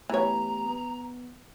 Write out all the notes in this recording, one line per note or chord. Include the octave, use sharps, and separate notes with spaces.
E3 A3 B3 G4 C#5 A#5
B3